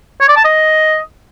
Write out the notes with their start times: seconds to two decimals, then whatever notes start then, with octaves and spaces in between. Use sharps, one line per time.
0.20 C#5
0.29 D5
0.37 A5
0.45 D#5